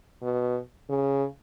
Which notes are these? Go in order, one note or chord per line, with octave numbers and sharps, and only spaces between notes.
B2
C#3